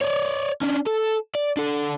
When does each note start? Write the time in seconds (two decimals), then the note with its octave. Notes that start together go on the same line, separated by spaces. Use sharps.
0.01 C#5 D5
0.62 C#4 D4
0.87 A4
1.35 D5
1.57 D4 A4